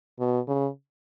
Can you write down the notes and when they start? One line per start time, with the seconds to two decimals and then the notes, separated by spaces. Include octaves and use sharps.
0.19 B2
0.47 C#3